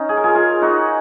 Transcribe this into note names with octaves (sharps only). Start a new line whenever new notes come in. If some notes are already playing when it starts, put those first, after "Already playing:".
Already playing: C#4 D#4
G#4
A#4
F4 G#4
F4 G#4
D#4 F#4